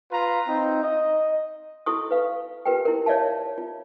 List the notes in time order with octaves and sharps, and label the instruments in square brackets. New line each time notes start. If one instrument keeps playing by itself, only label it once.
[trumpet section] F4 B4 A#5
C4 D#4
D#5
[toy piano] E4 F#4 A4 C#6 D#6
B4 F5
F4 G4 A#4 B4 G5
E4 A#4
C#5 D5 E5 F5 A5
F4